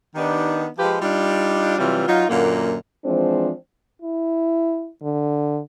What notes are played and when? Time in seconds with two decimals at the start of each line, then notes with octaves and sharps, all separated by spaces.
0.15 D#3 B3 D4 D#4 G4
0.79 F3 G#3 F4 G4 B4
1.00 G3 D4 D#4 F4
1.77 C3 E3 F#3 G3 F4
2.07 F#3 D#4 F4
2.28 F#2 A#2 D3 A#3
3.05 E3 F3 G#3 C4 D4
4.02 E4
5.03 D3